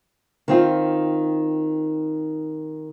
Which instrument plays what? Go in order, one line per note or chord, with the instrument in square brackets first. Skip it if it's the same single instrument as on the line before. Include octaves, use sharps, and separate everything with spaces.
[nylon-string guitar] D#3 C4 F4